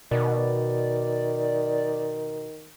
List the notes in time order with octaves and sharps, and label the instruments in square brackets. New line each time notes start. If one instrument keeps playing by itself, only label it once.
[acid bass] B2 [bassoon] D#3 [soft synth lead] D5